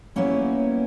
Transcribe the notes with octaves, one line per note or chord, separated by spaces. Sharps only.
F#3 G3 A#3 B3 C#4 E4